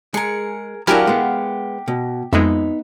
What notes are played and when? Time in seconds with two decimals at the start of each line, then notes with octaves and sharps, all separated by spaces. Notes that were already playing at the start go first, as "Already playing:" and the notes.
0.14 G#3 G#4 A#4 C#7
0.87 F#3 D4 E4 G4 A#4 F5 F#5 G#5
1.07 G#3 B3
1.88 B2
2.33 F2 G#3 B3 D#4 E5